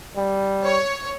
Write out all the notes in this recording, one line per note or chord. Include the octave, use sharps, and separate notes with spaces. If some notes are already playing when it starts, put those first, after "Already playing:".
G3
C#5